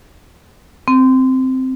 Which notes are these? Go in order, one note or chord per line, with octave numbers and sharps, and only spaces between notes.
C4